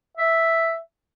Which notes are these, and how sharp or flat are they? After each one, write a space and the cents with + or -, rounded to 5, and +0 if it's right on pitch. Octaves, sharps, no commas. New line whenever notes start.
E5 +0